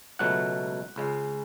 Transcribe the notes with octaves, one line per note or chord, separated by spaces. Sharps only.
C#2 B2 F#3 A3 F#5
C#2 C#3 G#3